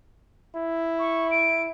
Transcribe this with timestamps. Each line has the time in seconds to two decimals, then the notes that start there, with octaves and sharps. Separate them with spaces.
0.55 E4
0.99 C#6
1.31 D7